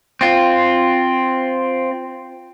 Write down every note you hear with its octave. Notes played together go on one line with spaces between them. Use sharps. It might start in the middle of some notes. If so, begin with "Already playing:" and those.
C4 F4